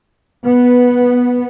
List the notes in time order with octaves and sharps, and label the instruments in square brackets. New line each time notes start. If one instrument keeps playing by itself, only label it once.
[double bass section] B3